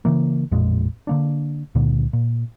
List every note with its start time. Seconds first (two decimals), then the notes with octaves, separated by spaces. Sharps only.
0.05 C#3 E3 A#3
0.51 A1 F2 A#2 G#3
1.07 D3 A#3 D4
1.75 C#2 A#2 D3
2.13 A#2